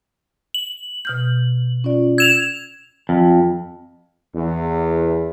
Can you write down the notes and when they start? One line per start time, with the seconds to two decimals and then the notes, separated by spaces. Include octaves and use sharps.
0.54 F#7
1.05 B2 F6 G6
1.84 C#4 F4 D5
2.18 E6 G#6 E7 F7
3.09 F2
4.34 E2